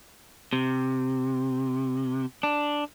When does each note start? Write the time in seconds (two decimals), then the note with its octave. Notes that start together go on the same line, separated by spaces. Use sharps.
0.53 C3
2.43 D4